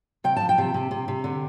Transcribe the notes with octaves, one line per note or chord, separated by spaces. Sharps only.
C3 G5
A5
F3
G5
C3
C3
C3
C3
D3